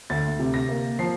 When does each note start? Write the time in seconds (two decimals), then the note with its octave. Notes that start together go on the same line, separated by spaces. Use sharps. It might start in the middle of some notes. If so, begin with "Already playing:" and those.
0.10 D2 A6
0.39 C3
0.54 A#6
0.69 A#3
0.99 F3 C7